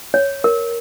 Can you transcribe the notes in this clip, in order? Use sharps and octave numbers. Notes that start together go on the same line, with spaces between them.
C#5
A#4